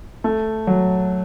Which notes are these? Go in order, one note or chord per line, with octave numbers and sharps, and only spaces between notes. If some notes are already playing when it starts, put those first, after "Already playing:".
A3
F#3